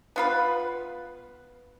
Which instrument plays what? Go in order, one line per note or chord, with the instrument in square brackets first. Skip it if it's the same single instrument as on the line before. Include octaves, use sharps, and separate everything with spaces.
[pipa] B3 F4 B4